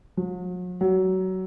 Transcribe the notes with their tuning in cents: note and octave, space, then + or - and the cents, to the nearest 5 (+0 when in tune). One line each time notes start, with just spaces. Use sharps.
F#3 -45
F#3 +20